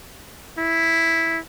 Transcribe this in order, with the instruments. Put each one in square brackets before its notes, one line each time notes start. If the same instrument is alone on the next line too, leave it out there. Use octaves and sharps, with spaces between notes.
[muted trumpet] E4